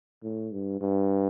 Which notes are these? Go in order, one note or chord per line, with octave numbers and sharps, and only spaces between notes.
A2
G2
G2